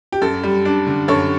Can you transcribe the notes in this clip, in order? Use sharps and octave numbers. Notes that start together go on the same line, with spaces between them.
G4
F#2 A4
G3
D4
D3
F#2 A4 C#5